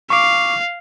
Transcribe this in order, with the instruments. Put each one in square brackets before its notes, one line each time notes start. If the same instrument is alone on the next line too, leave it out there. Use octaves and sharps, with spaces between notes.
[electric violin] F5 [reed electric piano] C#6 D6